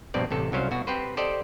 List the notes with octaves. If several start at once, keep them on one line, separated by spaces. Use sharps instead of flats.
A#1 G2 B2 C4 D5
A1 C3 A4
C2 F#3 C#4 C5 F5
B2 F#4
C4 G4 B4 C5
G4 A4 C5 D5 D#5